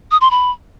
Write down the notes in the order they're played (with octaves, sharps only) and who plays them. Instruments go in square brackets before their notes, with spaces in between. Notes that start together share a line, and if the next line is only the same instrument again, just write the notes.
[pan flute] D#6
C6
B5